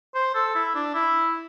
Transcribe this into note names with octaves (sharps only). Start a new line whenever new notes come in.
C5
A4
E4
D4
E4